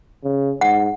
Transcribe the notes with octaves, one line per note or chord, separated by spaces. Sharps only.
C#3
G#2 F#5